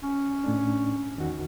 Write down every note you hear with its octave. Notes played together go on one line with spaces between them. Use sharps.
C#4
A2 A3 D4
E2 D#3 F#4